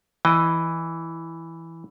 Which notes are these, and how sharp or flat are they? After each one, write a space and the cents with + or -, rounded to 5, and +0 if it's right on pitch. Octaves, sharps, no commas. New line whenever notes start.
E3 +0 D#5 +0